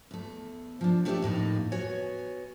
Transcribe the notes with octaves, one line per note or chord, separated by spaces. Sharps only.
E2 A3
F3 D4
A3 D4 G4 B4 D5 E5
F2 A2 A#3 D#4
B3 F#4 C#5 G#5